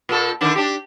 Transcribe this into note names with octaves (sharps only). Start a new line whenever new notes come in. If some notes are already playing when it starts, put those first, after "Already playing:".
A#2 A4
D3 D#3 D4
D4 G4